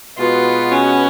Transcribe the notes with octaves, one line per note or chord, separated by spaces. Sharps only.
B2 G#3 B3 F4 F#4 B4
C#4